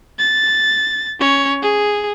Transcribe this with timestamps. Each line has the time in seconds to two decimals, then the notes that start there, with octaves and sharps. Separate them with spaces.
0.19 A6
1.20 C#4 C#5
1.63 G#4